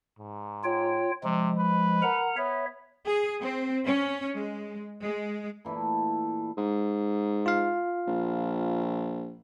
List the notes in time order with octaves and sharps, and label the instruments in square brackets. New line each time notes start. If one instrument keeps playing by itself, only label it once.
[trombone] G#2
[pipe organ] F4 C#5 G5
[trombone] C3 [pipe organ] F3 G#3
[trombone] B4
[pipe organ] A#4 F#5 A#5
[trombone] B3 [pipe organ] C#5 E5
[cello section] G#4
C4
C#4
G#3
G#3
[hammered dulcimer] A#2 E3 A3 E4
[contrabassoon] G#2
[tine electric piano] F4 F5
[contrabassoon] A#1